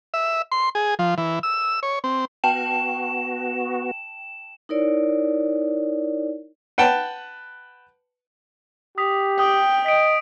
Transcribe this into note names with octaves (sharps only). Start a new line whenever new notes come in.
E5
C6
G#4
F3
E3
E6
C#5
C4
B3 F#4 G5 A5 E7
D#4 E4 A#4 C#5 D5
B4 F#5 G5 A5
G4 D#6 B6 F7
G5 D#6
D#5 B6 D7